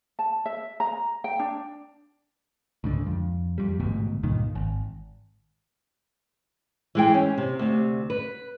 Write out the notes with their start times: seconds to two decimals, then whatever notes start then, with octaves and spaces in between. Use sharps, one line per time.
0.19 A5
0.46 E5
0.80 A#5
1.24 G5
1.39 D4
2.84 C#2 G#2 D3
3.07 F2
3.58 F2 G3
3.80 A1 D2 G#2 B2
4.23 C#2 G2 A#2 D#3
4.55 G#1
6.95 E3 G#3 G5
7.14 C#4 E4
7.38 C3
7.59 D2 C3
8.10 B4